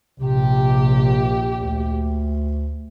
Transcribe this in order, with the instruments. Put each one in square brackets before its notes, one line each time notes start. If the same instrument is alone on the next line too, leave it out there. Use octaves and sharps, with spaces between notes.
[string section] A#1 G4 [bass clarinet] C3
[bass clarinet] D2